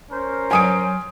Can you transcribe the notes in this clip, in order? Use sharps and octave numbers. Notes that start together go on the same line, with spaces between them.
C#4 A#4 C5
F#3 G#5 D#6 D7